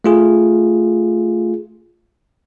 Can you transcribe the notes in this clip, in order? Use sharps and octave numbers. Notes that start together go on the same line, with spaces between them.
A3 F4 G#4